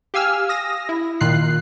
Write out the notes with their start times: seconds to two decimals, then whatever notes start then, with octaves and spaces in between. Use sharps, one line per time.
0.14 G4 F5 G#5 E6 F6
0.49 D#6 A#6
0.89 E4
1.21 A#2 D#3 F4 F#6 C7